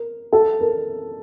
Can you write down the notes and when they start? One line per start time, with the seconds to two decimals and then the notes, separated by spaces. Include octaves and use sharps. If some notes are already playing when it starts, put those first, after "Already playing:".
Already playing: A#4
0.33 A4
0.61 A#4